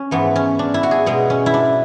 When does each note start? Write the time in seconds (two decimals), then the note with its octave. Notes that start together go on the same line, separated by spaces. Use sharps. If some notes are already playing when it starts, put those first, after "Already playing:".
Already playing: C#4
0.11 G#2 E3 A3 B3
0.36 C#4
0.59 D4
0.74 E4
0.83 F#4
0.91 G#4
1.06 B2 G#3 B3
1.30 C#4
1.46 E4
1.54 D4